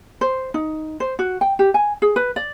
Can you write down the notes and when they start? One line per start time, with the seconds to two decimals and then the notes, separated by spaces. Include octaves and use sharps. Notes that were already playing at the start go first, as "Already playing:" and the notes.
0.21 C5
0.54 D#4
1.00 C5
1.19 F#4
1.41 G5
1.59 G4
1.74 G#5
2.02 G#4
2.16 B4
2.36 D5